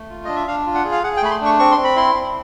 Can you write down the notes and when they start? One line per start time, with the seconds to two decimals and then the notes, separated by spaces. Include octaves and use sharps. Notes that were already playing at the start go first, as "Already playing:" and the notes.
Already playing: A3
0.10 F4
0.25 D4 D#5
0.36 E5
0.47 D4 F5
0.66 F4
0.75 F#5
0.85 G#4
0.92 F5
1.03 G#4 F#5
1.17 G5
1.22 A3 B5
1.31 C6
1.41 D4 C#6
1.59 C4 C#6
1.72 C6
1.78 C4
1.84 B5
1.96 E4 C6
2.15 C4